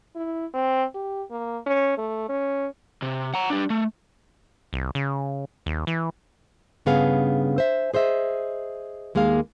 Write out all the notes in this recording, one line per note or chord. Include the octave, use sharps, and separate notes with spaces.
E4
C4
G4
A#3
C#4
A3
C#4
C3
F#5 A#5
G3 D4
A3
C2
C#3
D#2
E3
G2 C#3 B3 G#4 F5
C5 E5
G#4 C5 D#5 E5
D#2 G#3 A#3 G#4 F5